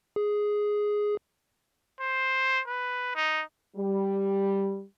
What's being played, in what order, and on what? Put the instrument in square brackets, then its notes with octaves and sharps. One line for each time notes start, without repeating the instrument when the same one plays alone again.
[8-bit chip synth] G#4
[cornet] C5
B4
D#4
[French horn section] G3